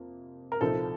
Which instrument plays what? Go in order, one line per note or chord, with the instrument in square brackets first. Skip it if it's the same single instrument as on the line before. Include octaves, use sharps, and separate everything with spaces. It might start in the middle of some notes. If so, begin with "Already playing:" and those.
Already playing: [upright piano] F2 C3 A#3
A#4
C2 A#2 F3 C4 D#4 A4